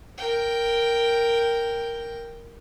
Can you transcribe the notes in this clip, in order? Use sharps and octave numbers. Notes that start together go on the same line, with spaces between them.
A#4 G5